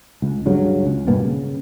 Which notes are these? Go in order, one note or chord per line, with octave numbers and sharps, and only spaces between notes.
C#2
C#2 G2 C#3 F#3
C#2
G2 B2 A#3 B3
C#3